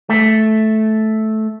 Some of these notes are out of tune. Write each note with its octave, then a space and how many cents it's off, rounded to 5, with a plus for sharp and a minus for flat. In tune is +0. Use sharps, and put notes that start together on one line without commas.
A3 -10